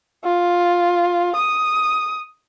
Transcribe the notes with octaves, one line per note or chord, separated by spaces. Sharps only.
F4
D#6